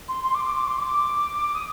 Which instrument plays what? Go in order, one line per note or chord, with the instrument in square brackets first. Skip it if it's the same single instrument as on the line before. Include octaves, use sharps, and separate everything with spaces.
[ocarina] C6
C6
D6
D6
D6
C6
D6
D#6